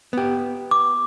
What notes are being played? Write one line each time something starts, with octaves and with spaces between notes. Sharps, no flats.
B3 G4
D6